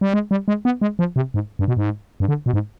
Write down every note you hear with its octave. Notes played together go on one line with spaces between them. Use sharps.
G3
G#3
G3
G#3
B3
G#3
F3
C3
G#2
G2
B2
G#2
G2
D3
B2
G#2